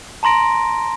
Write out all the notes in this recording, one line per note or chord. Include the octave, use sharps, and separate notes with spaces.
A5 A#5 C6 A#6 D7